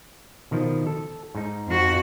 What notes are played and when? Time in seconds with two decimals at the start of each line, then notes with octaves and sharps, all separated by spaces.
0.51 B2 D#3 F3
0.87 A4
1.35 G#2 D#4
1.68 F2 F#4